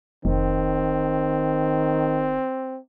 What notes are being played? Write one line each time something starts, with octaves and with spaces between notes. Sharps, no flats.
F1 D#3 C4